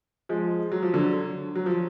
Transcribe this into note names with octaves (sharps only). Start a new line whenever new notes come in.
F3 G#3
F#3
F3
D3 F#3
F#3
F3